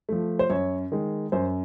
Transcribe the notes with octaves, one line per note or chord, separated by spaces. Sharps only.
F3 A3
C5
F#2 C#5
D#3 G#3
F#2 C5